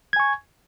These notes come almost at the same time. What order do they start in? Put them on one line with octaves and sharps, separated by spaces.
G#6 G#5 C#6